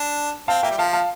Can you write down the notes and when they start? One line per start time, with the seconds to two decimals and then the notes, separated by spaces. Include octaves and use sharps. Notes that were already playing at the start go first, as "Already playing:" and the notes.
Already playing: D4
0.48 C4 F5 A5
0.63 A#3 E5 G5
0.71 G3
0.78 F3 F5 A5
0.93 F5 A5